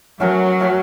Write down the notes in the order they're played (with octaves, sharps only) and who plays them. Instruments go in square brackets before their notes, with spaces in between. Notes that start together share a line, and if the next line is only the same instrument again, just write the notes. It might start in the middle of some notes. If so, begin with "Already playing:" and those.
[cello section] F#3 [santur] A3 C#4 F#4 A#4
[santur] A3 C#4 F#4 A#4